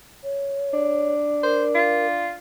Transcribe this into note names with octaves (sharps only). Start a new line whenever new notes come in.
C#5
D4
A#4 C5
F4